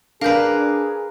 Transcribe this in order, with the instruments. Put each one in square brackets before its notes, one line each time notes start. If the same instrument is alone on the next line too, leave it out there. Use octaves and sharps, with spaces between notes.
[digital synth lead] D4 [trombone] G#4 [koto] A#4 B4 [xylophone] F5 G6